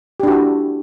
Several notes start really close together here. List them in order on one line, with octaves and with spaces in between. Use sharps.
G4 D4 F#4 E4